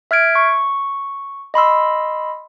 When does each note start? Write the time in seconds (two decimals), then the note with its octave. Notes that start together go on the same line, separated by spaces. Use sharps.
0.11 E5 F6 G#6 D7
0.35 C#6
1.54 D#5 B5 C6 E6